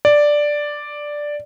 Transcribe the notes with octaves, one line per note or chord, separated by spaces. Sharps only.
D5